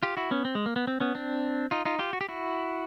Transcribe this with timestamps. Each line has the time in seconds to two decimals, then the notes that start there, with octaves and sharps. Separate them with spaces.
0.03 F4 G4
0.17 E4 F#4
0.31 B3 C#4
0.45 C4
0.55 G#3
0.66 A#3
0.76 B3
0.87 C4
1.00 B3 C#4
1.15 C4 D4
1.71 D#4 F4
1.85 D#4 F4
1.99 F4 G4
2.13 F#4
2.21 G4
2.29 E4 F#4